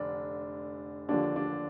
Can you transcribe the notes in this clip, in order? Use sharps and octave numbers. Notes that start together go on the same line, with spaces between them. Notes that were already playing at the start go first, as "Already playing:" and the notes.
Already playing: F1 D3 D4
D#2 D3 F3 D4
D4